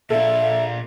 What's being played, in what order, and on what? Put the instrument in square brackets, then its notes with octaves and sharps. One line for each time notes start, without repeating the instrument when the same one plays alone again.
[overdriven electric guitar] A#2 D4 [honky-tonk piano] A4 [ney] E5